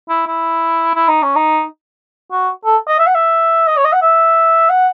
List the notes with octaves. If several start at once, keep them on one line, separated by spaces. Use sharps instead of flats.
E4
E4
E4
D#4
C#4
D#4
F#4
A4
D#5
E5
F#5
E5
D#5
C#5
D#5
F#5
E5
F#5